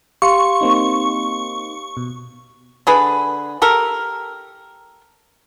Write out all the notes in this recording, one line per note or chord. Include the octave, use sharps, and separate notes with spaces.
G4 F5 C6 C#6
A#3 C4 D#4
B2
D3 G#4 B4
G4 A4 A#4